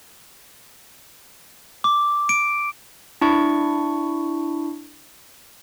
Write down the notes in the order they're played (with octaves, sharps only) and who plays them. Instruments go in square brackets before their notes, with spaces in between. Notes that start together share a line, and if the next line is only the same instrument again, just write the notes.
[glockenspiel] D6
D7
[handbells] D4 E4 C#6